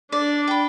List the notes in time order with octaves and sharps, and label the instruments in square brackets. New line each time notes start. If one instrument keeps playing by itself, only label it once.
[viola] D4 [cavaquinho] D5
[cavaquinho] G5 B5